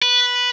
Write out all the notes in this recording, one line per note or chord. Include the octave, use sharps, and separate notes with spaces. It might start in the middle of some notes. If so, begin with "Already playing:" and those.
B4